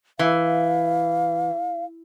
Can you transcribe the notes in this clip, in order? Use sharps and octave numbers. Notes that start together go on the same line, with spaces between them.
E3 F5